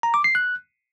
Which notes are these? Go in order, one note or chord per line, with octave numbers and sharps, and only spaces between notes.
A#5
D6
C7
F#6